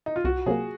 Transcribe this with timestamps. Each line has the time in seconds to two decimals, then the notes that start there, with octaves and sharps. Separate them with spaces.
0.06 D#4
0.16 F4
0.24 C2 F#4
0.46 C3 F#3 A#3 G#4